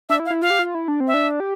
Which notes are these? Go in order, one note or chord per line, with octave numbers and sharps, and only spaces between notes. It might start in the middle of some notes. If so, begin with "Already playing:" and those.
D4 E5
E4
F5
E4
F4 F5
G4
F4
E4
D4
C4
E5
D4
G4